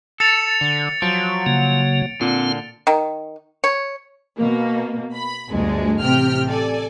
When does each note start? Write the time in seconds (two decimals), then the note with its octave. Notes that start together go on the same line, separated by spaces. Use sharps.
0.20 A4 A6 C#7 F7
0.61 D3
1.02 F3 F#3 D7
1.46 C#3 A#3
2.21 A#2 D3 C4 F4
2.87 D#3
3.64 C#5
4.37 B2 A#3
5.14 B5
5.50 G1 D2 G#3
6.02 A1 C3 G5 F6
6.48 A4 D5 G#5